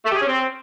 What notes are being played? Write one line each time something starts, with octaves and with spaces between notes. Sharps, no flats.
A3
G4
G#4
C#4
C4